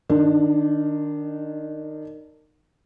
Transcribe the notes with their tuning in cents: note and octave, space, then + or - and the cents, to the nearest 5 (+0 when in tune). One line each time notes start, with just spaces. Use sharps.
D#3 -20 D4 +0